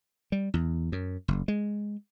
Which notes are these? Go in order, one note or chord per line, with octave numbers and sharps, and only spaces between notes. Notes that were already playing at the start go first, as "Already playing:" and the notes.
G3
E2
F#2
F#1
G#3